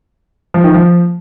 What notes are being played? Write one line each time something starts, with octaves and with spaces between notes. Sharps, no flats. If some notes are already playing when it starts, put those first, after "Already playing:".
F3
D#3
F3